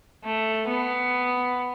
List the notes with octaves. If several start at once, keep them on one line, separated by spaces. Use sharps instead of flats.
A3
B3